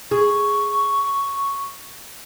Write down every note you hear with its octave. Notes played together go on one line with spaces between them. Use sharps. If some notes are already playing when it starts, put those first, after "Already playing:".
G#4 C#6